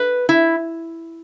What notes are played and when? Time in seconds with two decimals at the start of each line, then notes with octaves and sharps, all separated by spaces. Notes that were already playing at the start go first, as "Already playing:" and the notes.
Already playing: B4
0.29 E4